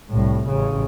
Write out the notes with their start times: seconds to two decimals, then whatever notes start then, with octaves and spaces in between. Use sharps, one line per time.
0.10 C2 A2
0.49 A1 C#3